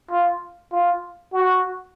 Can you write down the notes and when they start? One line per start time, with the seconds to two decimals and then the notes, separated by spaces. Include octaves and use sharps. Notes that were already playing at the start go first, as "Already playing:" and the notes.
0.10 F4
0.72 F4
1.33 F#4